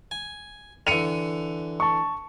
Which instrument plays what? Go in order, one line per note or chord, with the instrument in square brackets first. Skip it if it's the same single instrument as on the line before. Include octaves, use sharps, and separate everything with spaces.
[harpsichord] G#5
[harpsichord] D3 E3 [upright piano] C#7 D#7 F7
[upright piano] A5 C#6